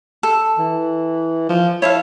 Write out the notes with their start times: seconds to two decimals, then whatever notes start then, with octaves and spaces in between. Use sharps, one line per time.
0.23 A4
0.58 E3
1.49 F3
1.82 E4 A4 C#5 F5